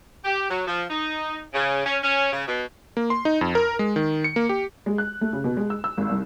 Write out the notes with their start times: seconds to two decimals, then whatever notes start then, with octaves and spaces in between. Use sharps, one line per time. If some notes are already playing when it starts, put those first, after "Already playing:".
0.25 G4
0.50 F#3
0.67 F3
0.90 D#4
1.54 C#3
1.85 C#4
2.02 C#4
2.33 C#3
2.48 B2
2.97 A#3
3.10 C6
3.25 D#4
3.41 F2
3.55 A#4
3.79 G#3
3.96 D#3
4.24 C#7
4.36 A#3
4.49 G4
4.86 G#3
4.98 F#6
5.21 A3
5.33 C#3
5.44 B2
5.57 G#3
5.70 E6
5.84 E6
5.97 G#1
6.10 C2